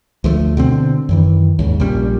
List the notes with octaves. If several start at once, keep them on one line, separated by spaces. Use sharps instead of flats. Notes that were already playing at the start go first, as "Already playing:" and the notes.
D2 F3 G#3 A3
B2 D3 C4
F#2 D#3 E3
D#2 G#2 C#3
A#1 A#2 G3 C#4